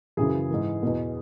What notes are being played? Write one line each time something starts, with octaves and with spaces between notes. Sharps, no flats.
F#2 C#3 E3 G#4
G#2 E3
E2 B2